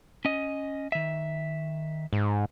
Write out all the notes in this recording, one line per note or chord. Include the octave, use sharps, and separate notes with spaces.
C#4 D#5
D#3 E5
G#2